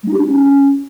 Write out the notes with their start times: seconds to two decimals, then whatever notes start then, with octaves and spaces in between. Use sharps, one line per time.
0.03 G#3
0.08 D#4
0.13 G4
0.18 D4
0.23 C#4